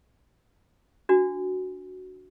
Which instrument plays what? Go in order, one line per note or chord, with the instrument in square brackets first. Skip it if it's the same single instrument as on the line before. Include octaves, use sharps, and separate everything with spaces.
[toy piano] D4 F#4